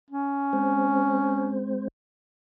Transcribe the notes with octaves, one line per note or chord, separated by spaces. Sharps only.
C#4
G#3 C4 C5